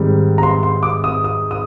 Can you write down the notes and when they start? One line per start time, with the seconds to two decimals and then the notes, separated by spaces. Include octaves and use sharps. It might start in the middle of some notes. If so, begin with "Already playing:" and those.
Already playing: G#2 D#3 G3 C4
0.38 A#5
0.43 C6
0.63 C6
0.83 D6
1.04 D#6
1.24 D#6
1.51 D#6